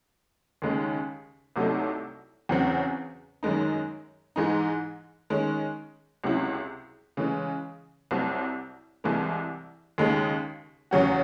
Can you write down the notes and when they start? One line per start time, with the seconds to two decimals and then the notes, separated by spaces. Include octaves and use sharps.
0.62 D#2 C#3 G#3 D#4
1.56 C2 C3 F#3 A3 D#4
2.49 E2 C#3 F#3 C4
3.43 F#2 D#3 G#3 D#4
4.36 G#2 E3 G#3 D#4
5.30 D#3 G#3 C#4
6.24 C#2 C3 F#3 C#4 E4
7.17 C#3 E3 G#3
8.11 C2 C3 F#3 C4
9.04 C2 C3 E3 G#3
9.98 D#2 C#3 G#3 D#4 G#4
10.91 E2 C#3 F#3 C#4 F#4